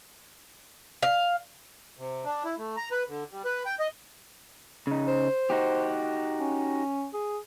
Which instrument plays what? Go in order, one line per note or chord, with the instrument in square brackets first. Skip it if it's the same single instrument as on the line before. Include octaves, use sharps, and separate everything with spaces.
[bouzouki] F5
[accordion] C3
D4
E4
A3
A#5
B4
D3
G3
B4
G5
D#5
[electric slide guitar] C#3 D#4
[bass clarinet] C5
[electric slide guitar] D#4 F#4 G4
[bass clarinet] C#4
G#4